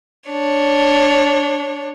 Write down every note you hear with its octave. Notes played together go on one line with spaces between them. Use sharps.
D4 C#5